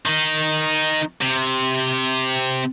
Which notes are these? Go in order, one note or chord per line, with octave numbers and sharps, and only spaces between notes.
D#3 D#4
C3